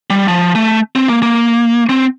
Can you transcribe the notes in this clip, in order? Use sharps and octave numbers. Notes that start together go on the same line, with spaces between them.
G3
F3
A3
C4
A#3
A#3
C4